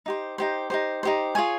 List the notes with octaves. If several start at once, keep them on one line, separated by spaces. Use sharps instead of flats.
D#4 G4 C5
D#4 G4 C5
D#4 G4 C5
D#4 G4 C5
F4 G#4 C#5 G#5